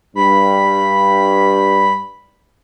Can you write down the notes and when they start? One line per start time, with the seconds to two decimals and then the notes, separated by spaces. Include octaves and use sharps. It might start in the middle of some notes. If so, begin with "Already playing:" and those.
0.15 G2 B5